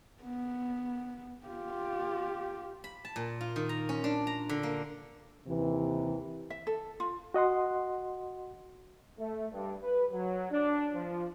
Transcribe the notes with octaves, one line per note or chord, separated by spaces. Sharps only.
B3
F4 G4
B5
A5
A#2
F4
D#3
A#5
C#4
D4
A#5
D3
A#3
D#2 C3 E3
E5
A4
F4
F#4 D#5 F#5 C6
A3
G2
B4
F#3
D4
F3